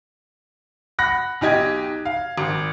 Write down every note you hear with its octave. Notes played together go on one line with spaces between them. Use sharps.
F#5 B5 F#6 A#6
B1 D#4 G4 D#5 G#6
F5
G#1